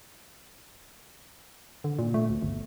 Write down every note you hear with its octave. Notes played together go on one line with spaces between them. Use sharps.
D3
A#2
A3
D2
G1